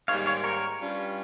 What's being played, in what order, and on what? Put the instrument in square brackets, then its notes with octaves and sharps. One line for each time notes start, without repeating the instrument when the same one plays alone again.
[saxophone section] G#2 D#3 G3 A#3 [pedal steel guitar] C#5 F5
[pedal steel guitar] C#5 F5
A#4 C#5
[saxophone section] G2 G3 C#4 F4